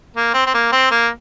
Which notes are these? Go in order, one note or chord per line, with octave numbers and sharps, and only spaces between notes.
A#3
C4
C4
A#3
C4
A#3